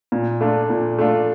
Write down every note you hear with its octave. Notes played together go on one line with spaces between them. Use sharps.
A#2
A3 D4 F4
A#2
A3 D4 F4